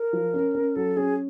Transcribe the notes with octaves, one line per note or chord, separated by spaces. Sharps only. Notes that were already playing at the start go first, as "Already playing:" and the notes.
Already playing: A#4
F3
C#4
C#4
F#3 A4
C#4 G#4